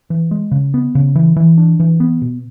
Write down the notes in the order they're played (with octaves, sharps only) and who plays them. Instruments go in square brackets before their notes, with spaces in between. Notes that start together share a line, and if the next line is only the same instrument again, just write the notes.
[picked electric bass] E3
G#3
C#3
B3
C#3
E3
E3
D4
E3
B3
B2